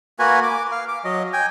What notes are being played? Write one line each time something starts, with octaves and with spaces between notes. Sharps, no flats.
A#3 F#4 B4 G#5
D6
F5
D6
F#3 D#5
G5 G#5